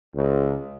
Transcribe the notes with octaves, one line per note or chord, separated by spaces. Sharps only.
C#2